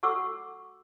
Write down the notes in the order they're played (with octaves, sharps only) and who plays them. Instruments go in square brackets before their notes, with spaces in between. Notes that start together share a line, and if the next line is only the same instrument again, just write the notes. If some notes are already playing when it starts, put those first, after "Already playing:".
[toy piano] F#4 A4 F#5 C#6 D6 E6